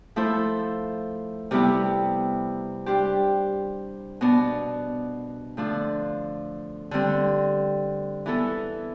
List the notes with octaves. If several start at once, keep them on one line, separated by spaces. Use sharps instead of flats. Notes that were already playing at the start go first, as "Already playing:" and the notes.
F3 A3 E4 A4 C5
C3 G3 B3 E4 G4
G3 D4 G4 C5
B2 B3 D4
D3 F3 A3 D4
D3 G3 C4
E3 B3 E4 A4